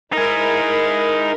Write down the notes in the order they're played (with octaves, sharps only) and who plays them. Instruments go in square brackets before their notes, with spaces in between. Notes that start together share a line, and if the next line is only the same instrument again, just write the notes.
[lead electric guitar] D#4 G#4 [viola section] E4 A#4